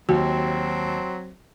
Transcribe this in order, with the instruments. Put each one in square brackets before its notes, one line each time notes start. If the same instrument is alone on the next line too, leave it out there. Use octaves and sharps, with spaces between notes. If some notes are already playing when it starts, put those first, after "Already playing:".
[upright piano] D#2 [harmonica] F#3 C4 [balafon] F#4